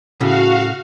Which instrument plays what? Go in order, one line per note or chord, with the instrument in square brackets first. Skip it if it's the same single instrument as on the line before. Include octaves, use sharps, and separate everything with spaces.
[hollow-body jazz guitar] A2 C#3 [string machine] F#4 F5